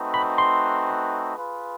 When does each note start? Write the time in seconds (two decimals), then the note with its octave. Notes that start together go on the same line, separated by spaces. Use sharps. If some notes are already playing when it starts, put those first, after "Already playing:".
Already playing: A3 C4 D#4 F#4 B4
0.14 B5
0.38 C6
1.35 F4 G#4 B4